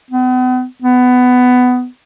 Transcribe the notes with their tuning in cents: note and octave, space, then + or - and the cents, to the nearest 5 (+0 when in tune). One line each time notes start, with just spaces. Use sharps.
B3 +40
B3 +15